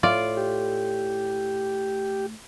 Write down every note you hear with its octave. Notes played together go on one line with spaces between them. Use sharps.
A2 F4 D5
G4